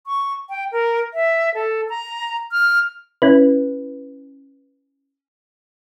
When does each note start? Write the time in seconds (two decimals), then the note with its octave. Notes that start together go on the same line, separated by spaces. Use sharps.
0.07 C#6
0.50 G5
0.72 A#4
1.14 E5
1.54 A4
1.89 A#5
2.52 F6
3.22 C#4 E4 B4